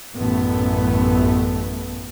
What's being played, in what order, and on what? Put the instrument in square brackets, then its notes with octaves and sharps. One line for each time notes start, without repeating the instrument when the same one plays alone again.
[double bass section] A1 F#2 A3 B3